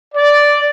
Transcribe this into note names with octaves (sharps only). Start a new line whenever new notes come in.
D5